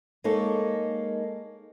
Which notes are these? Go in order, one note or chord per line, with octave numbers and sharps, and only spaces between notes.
G#3 A#3 D#4 G#4 A4 C#5